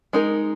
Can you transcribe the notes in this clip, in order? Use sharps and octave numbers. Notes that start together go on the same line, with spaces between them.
G#3 D#4 A#4